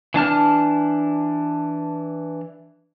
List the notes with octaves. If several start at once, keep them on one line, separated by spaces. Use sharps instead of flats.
E3 D4 A5 F6